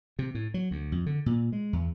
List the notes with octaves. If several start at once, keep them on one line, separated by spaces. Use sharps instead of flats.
C3
A2
F#3
D2
F2
D3
A#2
G#3
E2